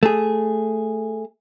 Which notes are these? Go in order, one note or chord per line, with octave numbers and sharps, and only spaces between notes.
A3 G#4